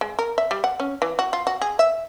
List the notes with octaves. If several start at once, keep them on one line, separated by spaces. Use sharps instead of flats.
G#3
A#4
E5
G3
F#5
C#4
E3
F#4
F4
F#4
G#4
E5